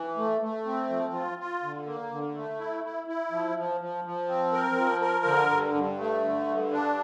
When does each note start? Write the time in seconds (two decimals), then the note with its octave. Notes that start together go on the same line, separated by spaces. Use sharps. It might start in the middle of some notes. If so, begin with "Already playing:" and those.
Already playing: E3
0.17 A3
0.41 A3
0.65 C4
0.90 F3
1.14 F4
1.39 F4
1.63 D3
1.86 A#3
2.11 D3
2.35 A3
2.59 E4
2.84 E4
3.07 E4
3.31 F3
3.56 F3
3.81 F3
4.04 F3
4.28 C4
4.53 A#4
4.76 F3
5.01 A#4
5.25 D3
5.50 G2
5.74 G2
5.98 A3
6.23 D3
6.47 G2
6.71 D4